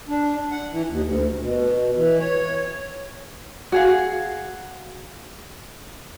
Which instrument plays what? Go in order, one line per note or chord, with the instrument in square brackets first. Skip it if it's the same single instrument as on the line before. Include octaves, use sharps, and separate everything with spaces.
[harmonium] D4
F#5
E3
D#2
D2
B2
E3
C#5
[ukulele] F#4 G#4 F5